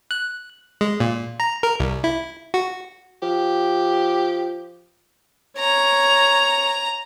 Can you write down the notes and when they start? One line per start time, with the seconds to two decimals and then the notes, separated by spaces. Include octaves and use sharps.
0.11 F#6
0.81 G#3
1.00 A#2
1.40 A#5
1.63 A#4
1.80 C2
2.04 E4
2.54 F#4
3.23 F3 G4
5.59 C#5 A#5